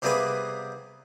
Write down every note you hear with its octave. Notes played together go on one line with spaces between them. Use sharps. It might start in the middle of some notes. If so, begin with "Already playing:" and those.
C3 G3 A#3 B3 G#4 B4